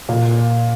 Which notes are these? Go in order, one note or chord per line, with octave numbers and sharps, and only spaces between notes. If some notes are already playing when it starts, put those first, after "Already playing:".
A#2